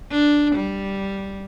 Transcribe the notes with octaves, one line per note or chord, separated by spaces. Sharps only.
D4
G3